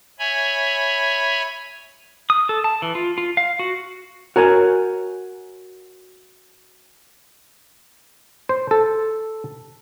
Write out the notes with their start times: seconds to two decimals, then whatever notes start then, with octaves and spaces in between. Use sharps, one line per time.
0.19 C#5 E5 G#5 B5
2.30 D#6
2.49 A4
2.64 A5
2.82 E3
2.95 F4
3.18 F4
3.37 F5
3.59 F#4
4.36 F#4 A#4 C#5 G#5
8.49 C5
8.71 A4